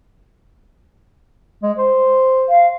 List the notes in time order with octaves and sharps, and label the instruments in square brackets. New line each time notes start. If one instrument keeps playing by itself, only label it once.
[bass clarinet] G#3
C5
[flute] F5